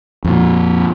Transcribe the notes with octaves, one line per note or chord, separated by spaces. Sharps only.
F2 A#2